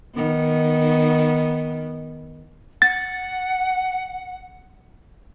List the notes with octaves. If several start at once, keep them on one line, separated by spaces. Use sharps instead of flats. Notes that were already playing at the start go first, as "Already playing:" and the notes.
D#3 B3
F#5 A6